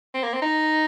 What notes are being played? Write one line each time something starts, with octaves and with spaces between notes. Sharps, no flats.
C4
A#3
C4
D#4